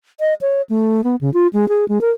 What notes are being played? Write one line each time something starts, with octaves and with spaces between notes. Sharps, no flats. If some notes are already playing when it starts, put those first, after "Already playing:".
D#5
C#5
A3
B3
C#3
F4
G#3
G#4
G#3
A#4